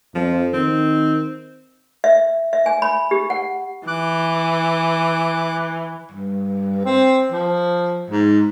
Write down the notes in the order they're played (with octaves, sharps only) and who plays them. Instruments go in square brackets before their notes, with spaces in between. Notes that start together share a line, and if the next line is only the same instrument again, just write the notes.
[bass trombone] F2 [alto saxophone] F3
[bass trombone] D#3 [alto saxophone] C4
[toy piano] E5
E5
G#5
B5
G4
F#5
[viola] E3 [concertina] D6 F#6
[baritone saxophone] G2
C4
F3
G#2